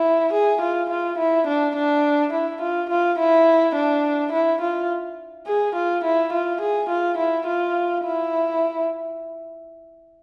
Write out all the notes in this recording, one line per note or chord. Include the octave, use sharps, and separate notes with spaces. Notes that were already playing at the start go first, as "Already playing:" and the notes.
Already playing: E4
G#4
F4
F4
E4
D4
D4
E4
F4
F4
E4
D4
E4
F4
G#4
F4
E4
F4
G#4
F4
E4
F4
E4